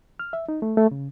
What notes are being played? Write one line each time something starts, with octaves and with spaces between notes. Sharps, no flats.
F6
E5
D#4
A3
A3
C#3